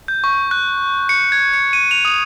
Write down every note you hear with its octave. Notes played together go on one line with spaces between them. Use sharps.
G6
C#6
F#6
C#7
G#6
C#7
D#7
F7
D#6